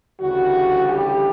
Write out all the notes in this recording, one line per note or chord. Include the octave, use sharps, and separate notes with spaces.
D2 C#3 E3 G3 F#4
G4